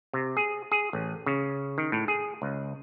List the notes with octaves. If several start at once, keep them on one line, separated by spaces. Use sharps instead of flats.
C3
G#4
G#4
A1
C#3
D#3
A2
G#4
C#2